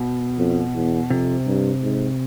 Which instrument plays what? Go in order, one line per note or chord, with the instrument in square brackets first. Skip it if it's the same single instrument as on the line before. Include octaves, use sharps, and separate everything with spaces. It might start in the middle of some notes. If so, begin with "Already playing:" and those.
Already playing: [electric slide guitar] B2
[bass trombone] F2
E2
[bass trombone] F2 [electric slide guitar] C3
[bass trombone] G2
G#2